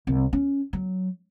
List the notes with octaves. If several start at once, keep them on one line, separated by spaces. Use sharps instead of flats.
C2
C#4
F#3